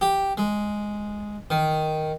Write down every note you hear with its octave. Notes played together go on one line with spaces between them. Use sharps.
G4
G#3
D#3